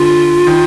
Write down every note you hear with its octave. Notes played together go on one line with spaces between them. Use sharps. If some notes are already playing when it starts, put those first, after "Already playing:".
Already playing: D3 F4
D#3